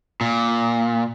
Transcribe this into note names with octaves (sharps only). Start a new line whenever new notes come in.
A#2